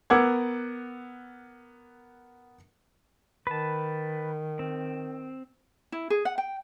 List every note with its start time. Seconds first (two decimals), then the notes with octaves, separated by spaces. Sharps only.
0.10 B3 A#4 F#5 D6 E6 G#6
3.47 D#3 B4 A5
4.59 C4
5.92 E4
6.10 G#4
6.25 F#5
6.38 G5